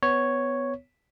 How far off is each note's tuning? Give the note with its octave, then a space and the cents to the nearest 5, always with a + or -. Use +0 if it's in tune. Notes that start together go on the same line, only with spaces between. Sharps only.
B3 +15 C#5 +0